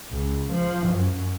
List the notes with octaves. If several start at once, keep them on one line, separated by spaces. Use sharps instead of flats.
C#2
F3
F#2